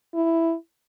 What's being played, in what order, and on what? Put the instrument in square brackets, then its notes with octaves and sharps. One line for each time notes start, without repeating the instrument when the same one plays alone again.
[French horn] E4